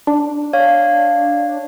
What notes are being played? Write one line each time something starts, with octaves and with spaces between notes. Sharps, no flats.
D4
C#5 F5